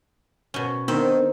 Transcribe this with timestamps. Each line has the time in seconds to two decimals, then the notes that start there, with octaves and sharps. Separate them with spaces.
0.54 B2 C#4
0.88 D#3 B3 C4 D4